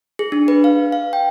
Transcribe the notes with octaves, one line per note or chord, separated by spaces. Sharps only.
G#4
D4
B4
F5
F5
G5